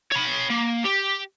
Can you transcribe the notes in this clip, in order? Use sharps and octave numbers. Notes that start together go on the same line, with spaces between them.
C#5 B5
A#3
G4